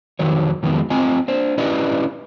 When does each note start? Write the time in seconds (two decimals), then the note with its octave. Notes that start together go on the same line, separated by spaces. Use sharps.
0.19 F2 D#3 F#3 C#5
0.63 F2 D#3 F#3 G#3 B3
0.90 C4 F4 D#5 G#5
1.28 D4 C5
1.58 C#4 E4 G4 B4 D5 D#5